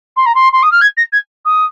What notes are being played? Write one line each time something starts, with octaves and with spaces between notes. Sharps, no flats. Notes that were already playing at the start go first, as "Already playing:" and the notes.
C6
A#5
C6
C6
D#6
F6
G#6
A#6
G#6
D#6